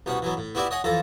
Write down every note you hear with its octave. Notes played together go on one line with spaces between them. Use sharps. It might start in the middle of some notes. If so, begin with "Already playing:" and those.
C2 B2 C#4 F#5
E3 F#3 B3
A2
B3 E4 F#4 G4 D5 E5
C#5 D#5 F#5 G#5
F2 E3 F4 A4 A#5